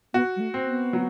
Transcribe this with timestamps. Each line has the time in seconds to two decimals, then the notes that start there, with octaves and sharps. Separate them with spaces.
0.14 B3 F#4
0.36 G3
0.40 A3
0.54 C4
0.67 B3
0.93 F#3